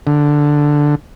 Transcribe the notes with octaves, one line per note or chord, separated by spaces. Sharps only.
D3